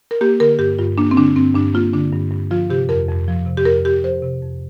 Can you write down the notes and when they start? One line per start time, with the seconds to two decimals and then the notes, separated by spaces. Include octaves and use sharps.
0.11 A#4
0.21 A#3 G4
0.40 D3 A#4
0.59 G2 G4
0.78 G2 F4
0.98 A#3 D4
1.11 C4
1.17 D3 D4
1.36 G2 C4
1.55 G2 D4
1.74 A#3 F4
1.93 D3 D4
2.12 G2
2.31 G2
2.51 F3 F4
2.70 C3 G4
2.89 F2 A#4
3.08 F2
3.28 F3
3.46 C3
3.57 G4
3.65 F2 A#4
3.85 F2 G4
4.04 F3 C5
4.23 C3
4.42 F2